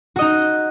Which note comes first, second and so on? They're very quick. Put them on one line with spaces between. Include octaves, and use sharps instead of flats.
F#4 D#5 D#4